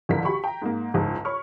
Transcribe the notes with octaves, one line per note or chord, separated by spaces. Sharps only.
F#1 C#2 D3 E3 A#4 B6
F#4 G4 B5 C#6
G5 A#5
G#2 A#3
F#1 C#2 G#2
C#5 B5 C#6 F6